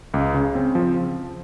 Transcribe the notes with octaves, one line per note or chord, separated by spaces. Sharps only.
C#2
C#3
C4
F3